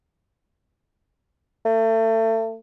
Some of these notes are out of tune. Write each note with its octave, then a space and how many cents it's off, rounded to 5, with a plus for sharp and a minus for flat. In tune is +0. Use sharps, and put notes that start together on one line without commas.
A3 +30